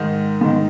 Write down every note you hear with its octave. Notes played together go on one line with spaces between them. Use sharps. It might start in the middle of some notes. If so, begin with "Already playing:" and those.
Already playing: G#2 D#3 D#5
G#2 D#3